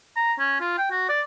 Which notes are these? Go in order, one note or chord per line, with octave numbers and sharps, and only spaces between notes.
A#5
C#4
F4
G5
F#4
D5